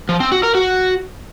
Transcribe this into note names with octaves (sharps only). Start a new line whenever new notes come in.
F3
C4
F#4
A#4
F#4